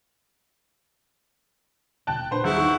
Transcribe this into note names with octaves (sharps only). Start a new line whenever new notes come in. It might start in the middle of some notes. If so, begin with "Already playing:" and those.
D#1 D2 B2 G5 A5 F#6
A#2 D4 B4 C5
G1 D#2 D#3 F#3 E4 F#4 G#4
D#4